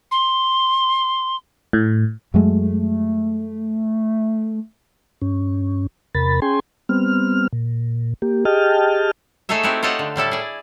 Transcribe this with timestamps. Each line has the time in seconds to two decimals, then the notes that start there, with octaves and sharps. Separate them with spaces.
0.11 C6
1.73 A2
2.34 F#2 F#3 G#3 A3
5.22 G2 C#4
6.15 E2 C3 A#4 B5 A6
6.42 C#4 G#4 G5 G#5 C6
6.89 G3 B3 C4 F6
7.53 A#2
8.22 A#3 G4
8.45 G4 G#4 D#5 G5 A5 F6
9.49 A3 D#4 G#4 A4 C#5 E5
9.63 C4 D#4 E4 F#4 G4
9.83 F4 G4 A4 C#5 D#5 F#5
9.99 D3
10.16 A2 G3 E4 A4
10.31 G#4 D5